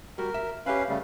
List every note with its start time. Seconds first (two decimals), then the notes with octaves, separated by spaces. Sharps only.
0.18 G3 F#4 A#4
0.34 E5
0.66 C#4 G4 B4 E5 F5 B5
0.89 C#3 G3 A3